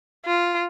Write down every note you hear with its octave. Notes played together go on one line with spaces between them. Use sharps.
F4